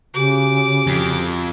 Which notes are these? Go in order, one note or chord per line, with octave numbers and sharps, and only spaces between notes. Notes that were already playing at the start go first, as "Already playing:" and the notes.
C#3 F#4 G4 G#5 D6
F2